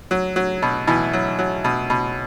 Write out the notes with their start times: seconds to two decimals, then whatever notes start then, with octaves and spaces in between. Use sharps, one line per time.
0.11 F#3
0.36 F#3
0.62 B2
0.87 B2 E3 E4
1.13 F#3
1.39 F#3
1.64 B2
1.90 B2